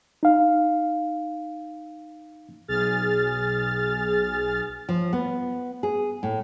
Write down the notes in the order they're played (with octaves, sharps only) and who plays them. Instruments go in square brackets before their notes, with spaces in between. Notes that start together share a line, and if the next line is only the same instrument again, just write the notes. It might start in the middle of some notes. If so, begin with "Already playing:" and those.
[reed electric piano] D#4 F5
[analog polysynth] B1 G#4 F6 A6
[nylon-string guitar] F3
B3
G#4
A2